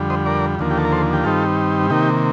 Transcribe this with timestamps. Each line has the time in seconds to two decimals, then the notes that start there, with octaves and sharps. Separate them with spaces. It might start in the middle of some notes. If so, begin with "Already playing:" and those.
Already playing: F2 D3 G3
0.10 C5 D#5
0.26 A#4 D5
0.59 D#2 D3 F3 A#3
0.71 G4
0.78 A4
0.85 A#4
0.92 A4 C5
1.13 G4
1.24 G2 D#3 G3 C4 D#4 F4 A4
1.90 C3 D#3 A#3 D#4 G4